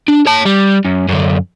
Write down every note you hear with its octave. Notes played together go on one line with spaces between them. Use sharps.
D4
C#5 A5
G3
F#2
F#2 D3